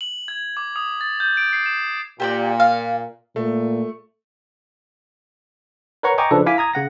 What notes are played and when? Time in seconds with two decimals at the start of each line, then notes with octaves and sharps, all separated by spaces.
0.01 F#7
0.28 G#6
0.57 D6
0.76 D#6
1.01 A6
1.20 G6
1.37 D7
1.53 C7
1.66 E7
2.20 A#2 G4 C5 D5
2.60 F5
3.36 A#2 A3
6.03 A#4 B4 C#5 F#5 A#5 C#6
6.18 D#5 G5 G#5 A#5 C#6 D6
6.31 C#3 F3 D4 A4 B4
6.46 E4 F5 G#5 D6 B6
6.58 A#5 D#6 G#6
6.73 C#3 F#5 A#6